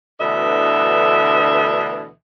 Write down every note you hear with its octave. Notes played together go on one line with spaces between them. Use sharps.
D2 B2 D3 E3 D#5 E5